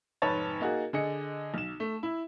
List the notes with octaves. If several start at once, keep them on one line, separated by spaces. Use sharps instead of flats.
F1 G#2 B4 C#5 A5 A6
A#3 D#4 F#4 G#4
D3 G#4 D#5 C#7
B1 E7
A3
E4